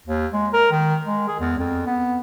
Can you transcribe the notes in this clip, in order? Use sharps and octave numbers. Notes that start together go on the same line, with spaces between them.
D#2
G#3
A#4
D#3
G#3
G#4
E2
F2
B3